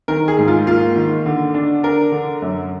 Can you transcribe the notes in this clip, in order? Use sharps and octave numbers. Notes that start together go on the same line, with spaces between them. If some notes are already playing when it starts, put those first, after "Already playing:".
D#3 A#4
G#4
G#2
F4
A#3 F4
D#3
D3
D4
D4 A#4
D3
F#2